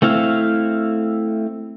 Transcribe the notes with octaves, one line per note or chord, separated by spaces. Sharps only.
A3 C4 E4 F5